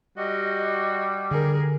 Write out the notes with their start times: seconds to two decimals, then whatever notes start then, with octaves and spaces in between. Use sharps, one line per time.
0.18 G3 F#4 D#5
1.31 D3 G#4 A#4